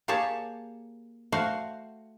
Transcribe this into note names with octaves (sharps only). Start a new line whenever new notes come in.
A#3 G4 G#4 C#5 A5
A3 F#4 C5 F5 F#5